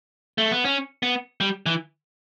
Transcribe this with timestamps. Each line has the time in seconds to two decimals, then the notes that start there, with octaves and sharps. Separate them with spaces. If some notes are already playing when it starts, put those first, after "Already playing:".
0.38 A3
0.51 B3
0.65 C#4
1.03 B3
1.41 G3
1.66 E3